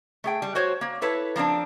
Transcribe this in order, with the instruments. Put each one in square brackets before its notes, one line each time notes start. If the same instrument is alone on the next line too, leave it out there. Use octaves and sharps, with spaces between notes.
[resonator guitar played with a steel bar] A3 G#4 G5
G3
F#4 C5 C#5
A#3
E4 A4 B4 C#5
F3 A#3 C4 D4